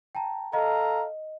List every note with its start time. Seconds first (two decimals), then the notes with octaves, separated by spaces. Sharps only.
0.15 G5 A5 A#5
0.53 A4 D#5 F5 A#5